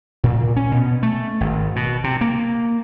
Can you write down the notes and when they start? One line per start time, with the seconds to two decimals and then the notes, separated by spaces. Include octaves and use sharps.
0.24 A#2
0.56 C#4
0.72 B2
1.03 A3
1.40 G#1
1.76 B2
2.04 C3
2.21 A#3